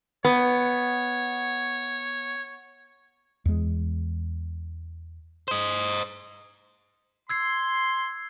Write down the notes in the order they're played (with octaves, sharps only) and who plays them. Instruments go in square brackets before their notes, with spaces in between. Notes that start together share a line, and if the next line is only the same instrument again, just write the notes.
[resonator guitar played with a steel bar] B3 [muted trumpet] C#5
[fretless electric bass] E2 G#3
[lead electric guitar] C5 D#5
[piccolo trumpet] C6 [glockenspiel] E6 G#6 C7